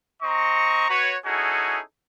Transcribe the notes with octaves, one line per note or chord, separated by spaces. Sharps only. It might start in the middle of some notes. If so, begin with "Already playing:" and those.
C4 D#5 A#5 C#6
F#4 B4 C#5
C#4 D#4 E4 F#4 G#4 A4